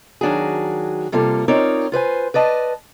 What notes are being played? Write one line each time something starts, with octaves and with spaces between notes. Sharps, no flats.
D#3 F#3 D4 F#4 G#4
C3 G3 A#3 F4 A4
C4 D#4 F4 A#4 C#5 D5
F4 B4 C5 G#5
B4 D5 D#5 A5